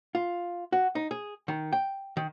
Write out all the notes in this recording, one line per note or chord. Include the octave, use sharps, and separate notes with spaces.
F4
F#4
D#4
G#4
D#3
G5
D#3